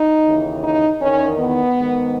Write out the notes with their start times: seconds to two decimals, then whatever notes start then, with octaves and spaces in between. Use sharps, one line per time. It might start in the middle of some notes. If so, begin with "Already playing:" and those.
Already playing: D#4
0.24 D#2 C#3 E3
0.63 D#4
1.01 E2 D#3 C#4
1.39 B3
1.77 G#2 D#3